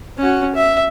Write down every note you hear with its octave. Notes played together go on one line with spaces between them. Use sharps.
C#4 F#4
E5